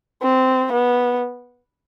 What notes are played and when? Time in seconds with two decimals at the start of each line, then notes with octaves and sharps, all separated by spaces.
0.22 C4
0.72 B3